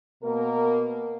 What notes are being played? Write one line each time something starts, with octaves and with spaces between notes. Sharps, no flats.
B2 A#3 A#4